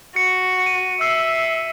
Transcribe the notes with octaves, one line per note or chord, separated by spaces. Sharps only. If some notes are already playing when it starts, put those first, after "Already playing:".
F#4 C#7
D#7
E5 E6 C7